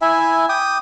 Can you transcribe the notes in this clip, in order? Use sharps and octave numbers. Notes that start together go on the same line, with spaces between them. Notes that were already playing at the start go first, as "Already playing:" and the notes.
E4 E5 G#5
G5 D6 D#6